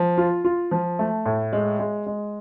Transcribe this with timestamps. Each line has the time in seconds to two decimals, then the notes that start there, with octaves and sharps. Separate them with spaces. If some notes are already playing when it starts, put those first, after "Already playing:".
Already playing: F3
0.18 F4
0.45 F4
0.71 F3
0.99 A3
1.26 A2
1.53 G#3
1.79 G#3
2.06 G#3